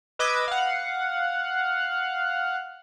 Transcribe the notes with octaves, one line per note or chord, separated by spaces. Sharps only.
B4 D#5 D6 E6 G#6
F5 F#5